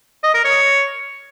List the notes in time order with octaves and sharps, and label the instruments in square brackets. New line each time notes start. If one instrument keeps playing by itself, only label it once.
[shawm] D#5
A#4
C#5